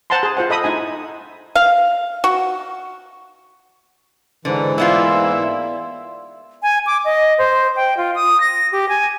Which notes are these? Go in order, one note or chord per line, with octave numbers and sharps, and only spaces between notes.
C5 F#5 A5 A#5 C6
G#4
F4 C5 F#5
A4 D#5 B5 D#6
D#4 E4 G#5
F5
F#4
G#2 D3 E3 B4 C5
A#3 B3 E4 F4 D5 E5 C6
G#5
D6
D#5
C5
G5
F4
D#6
A#6
G4
G#5